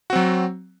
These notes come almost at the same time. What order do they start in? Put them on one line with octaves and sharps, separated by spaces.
F#4 C4 F#3